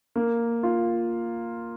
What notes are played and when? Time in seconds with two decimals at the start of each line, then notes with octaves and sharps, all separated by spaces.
0.16 A#3
0.63 F4